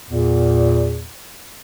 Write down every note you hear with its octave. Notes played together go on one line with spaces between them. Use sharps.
E2 A#2